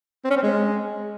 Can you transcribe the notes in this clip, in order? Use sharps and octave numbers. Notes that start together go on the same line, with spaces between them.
C4
C#4
C4
G#3